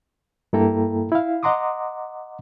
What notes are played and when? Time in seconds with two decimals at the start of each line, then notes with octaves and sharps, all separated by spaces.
0.53 G2 A#3 E4 A4 G5 A#5
1.12 E4 F5
1.43 D#5 F#5 A#5 C6 D6 D#6